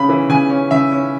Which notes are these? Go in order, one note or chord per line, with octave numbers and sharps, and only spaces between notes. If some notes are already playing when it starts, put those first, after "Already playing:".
Already playing: C#3 C#4 B5
E3
C#3 G#5
C#4
C#3 E5
C#4